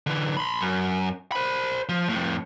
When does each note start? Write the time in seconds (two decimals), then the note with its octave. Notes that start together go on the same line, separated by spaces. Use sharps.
0.07 D3 E3
0.37 B5 C6
0.61 F#2
1.32 C5 B5
1.89 F3
2.09 F2 A2